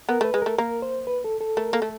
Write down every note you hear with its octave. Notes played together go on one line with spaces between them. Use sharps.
B3 A#4
A3
B4
G#3
A3 A#4
A#3 A#4
C5
B4
A4
A4
A3 A#4
A#3 A4
A3